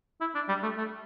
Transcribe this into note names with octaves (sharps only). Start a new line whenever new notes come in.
E4
D4
G3
A3
A3